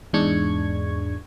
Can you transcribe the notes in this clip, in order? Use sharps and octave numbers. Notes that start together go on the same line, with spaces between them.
E2 G#2 G#3 D4 C#6 G#6